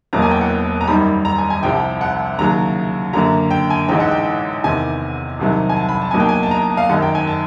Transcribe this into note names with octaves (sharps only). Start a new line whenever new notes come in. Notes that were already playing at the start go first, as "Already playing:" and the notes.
E1 E2 B2 F#3 A#3 A#5
G#5
G5
F#5
A#5
G#1 F#2 D#3 G3 B5
A#5
G#5
G#5
C2 C3 F3 G5
F#5
D#2 C#3 F#3 A#5
F#2 D3 F#3 A#3 A#5
G5
G#5
A1 G#2 E3 G#3 G5
F#5
G5
E2 C3 D#3 G#5
C2 C3 D#3 F#3
G#5
A5
B5
A5
B1 B2 F#3 A#3 G#5
G5
G#5
A5
A#5
F5
G#1 F#2 D#3 F#3 F#5
G5
G#5
A5